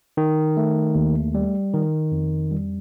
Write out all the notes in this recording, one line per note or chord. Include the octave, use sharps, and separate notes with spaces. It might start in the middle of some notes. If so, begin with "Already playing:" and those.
D#3
A3
D#2
G3
D#3
F2
G3